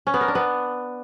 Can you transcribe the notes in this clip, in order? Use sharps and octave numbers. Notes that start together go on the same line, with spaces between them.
C#4
B3
A#4
D4
B3